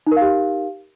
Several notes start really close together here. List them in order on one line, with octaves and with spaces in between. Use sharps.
D#4 A#4 F5 G4